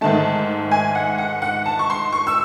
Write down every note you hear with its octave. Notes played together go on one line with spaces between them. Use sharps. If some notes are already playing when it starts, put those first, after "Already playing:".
G#2 D#3 A3 A5
G#5
F#5
F#5
F#5
A5
C#6
C6
C#6
E6